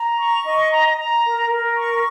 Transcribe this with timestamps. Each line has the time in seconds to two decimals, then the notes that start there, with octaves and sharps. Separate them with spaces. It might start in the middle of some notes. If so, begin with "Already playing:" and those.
Already playing: A#5
0.19 C#6
0.45 D#5
0.71 A#5
0.97 A#5
1.25 A#4
1.50 A#4
1.77 C#6